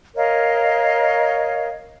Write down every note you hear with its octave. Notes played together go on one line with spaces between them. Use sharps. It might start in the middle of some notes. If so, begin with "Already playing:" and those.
A#4 C#5 D#5 F5